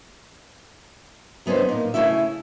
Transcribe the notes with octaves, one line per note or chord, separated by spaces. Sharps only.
D3 B3 C#4 D#4 C5
A#2 D#4
C#3 F#3 A3 C#4 E4 E5